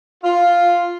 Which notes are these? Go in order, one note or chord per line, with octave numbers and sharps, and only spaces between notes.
F4